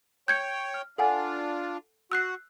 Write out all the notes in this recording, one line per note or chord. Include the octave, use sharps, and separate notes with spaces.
C#5 G5 G6 G#6 C#7
F6
D4 F4 A4 F#5 G#5
F#4 E6 F#6 C7